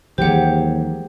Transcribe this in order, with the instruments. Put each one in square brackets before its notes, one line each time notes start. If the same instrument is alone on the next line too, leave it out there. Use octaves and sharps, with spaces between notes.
[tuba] D#2 [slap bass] E3 F#3 G#3 [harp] G4 G#4 [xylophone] C5 F#5